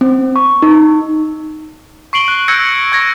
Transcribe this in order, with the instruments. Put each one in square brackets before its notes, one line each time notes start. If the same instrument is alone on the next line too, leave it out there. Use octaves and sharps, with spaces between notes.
[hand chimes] C4
C#6
D#4
[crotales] C#6 C7 D7 F#7 G7
F#6
E6 G6 G#6 A#6 C#7 D7
C#6 G#6 A#6 D7